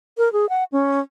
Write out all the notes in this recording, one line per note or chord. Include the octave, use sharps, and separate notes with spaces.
A#4
G#4
F#5
C#4